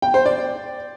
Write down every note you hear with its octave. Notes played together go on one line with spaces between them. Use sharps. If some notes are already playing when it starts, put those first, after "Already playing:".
G5
C5
D5